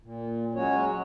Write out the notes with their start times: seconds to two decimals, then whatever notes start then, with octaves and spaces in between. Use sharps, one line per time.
0.02 A#2
0.55 F#3 G#3 C#4 F#4 C#5